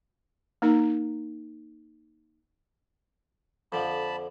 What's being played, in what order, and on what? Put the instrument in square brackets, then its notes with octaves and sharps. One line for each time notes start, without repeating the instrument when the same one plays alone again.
[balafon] A#3 D#4 A#4 A#5
[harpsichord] F2 D3 F3 [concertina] A5 B5